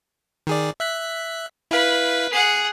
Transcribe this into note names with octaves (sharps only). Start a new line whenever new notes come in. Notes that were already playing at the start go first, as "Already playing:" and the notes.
D#3 G#4 D5
E5 F#6 B6
E4 B4 F5
G#4 F#5 C7